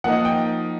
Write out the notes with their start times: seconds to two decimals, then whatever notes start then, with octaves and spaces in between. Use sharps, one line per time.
0.04 F3 A#3 D#4 F#5
0.25 G5